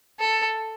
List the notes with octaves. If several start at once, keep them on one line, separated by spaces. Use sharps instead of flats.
A4